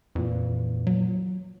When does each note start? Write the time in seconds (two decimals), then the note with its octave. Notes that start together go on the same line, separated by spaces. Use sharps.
0.15 F2 A#2 E3
0.87 F#3